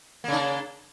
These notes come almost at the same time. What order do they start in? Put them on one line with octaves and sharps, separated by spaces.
A#3 C#3 D4